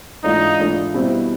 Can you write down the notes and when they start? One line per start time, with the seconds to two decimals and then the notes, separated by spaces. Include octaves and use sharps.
0.24 G#2 E3 A3 D4 D#4 F4
0.59 G#2 E3 A3 D4 F4
0.94 B2 G3 C4 E4